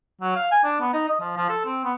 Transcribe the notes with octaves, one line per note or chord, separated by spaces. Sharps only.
F#3
F5
G#5
D4
B3
D#4
D#5
F3
F3
A4
C4
B3